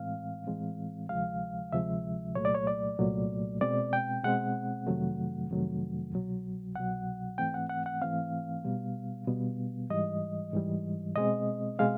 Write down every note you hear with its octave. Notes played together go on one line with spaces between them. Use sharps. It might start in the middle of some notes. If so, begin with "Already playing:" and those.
Already playing: A2 E3 G#3 C4 F5
A2 E3 G#3 C4
D2 C3 F3 G#3 F5
D2 C3 F3 G#3 E5
C2 A#2 F#3 A3 C#5
D5
C#5
D5
C2 A#2 F#3 A3
B2 G#3 C4 D5
G5
B2 G#3 C4 F#5
F2 C3 D#3 F#3 A3
F2 C3 D#3 F#3 A3
C2 B2 F#3
C2 B2 F#3 F#5
G#2 E3 A3 C4 G5
F#5
F#5
F#5
G#2 E3 A3 C4 F5
B2 G3 B3
B2 G3 B3
G#2 E3 G3 D#5
G#2 E3 G3
B2 G#3 C4 D#5
B2 G#3 C4 F5